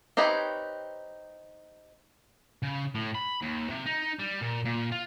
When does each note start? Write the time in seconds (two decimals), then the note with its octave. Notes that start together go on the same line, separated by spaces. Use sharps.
0.17 C4 D#4 G4 B4 C#5
2.62 C#3
2.95 A2
3.15 B5
3.42 D#2
3.69 C3
3.86 D#4
4.19 G3
4.41 A#2
4.65 A#2
4.92 F4